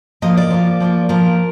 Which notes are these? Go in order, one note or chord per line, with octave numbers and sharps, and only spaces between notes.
F3 A#3 F4 D#5
D5
F3 A#3 F4
F3 A#3 F4
F3 A#3 F4 A#4